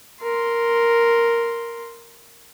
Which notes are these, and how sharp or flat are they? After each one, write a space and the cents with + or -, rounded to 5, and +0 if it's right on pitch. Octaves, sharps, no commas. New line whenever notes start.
A#4 +0 C6 +0